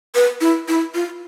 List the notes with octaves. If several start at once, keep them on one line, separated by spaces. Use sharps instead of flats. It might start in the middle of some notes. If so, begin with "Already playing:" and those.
B4
E4
E4
F4